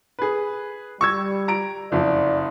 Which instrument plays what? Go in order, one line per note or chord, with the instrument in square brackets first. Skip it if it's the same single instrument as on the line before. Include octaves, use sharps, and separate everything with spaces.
[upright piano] G#4 B4
[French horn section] G3 [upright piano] C#6 E6 G#6
[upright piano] A#5 D7
[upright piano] F#1 F2 [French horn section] D5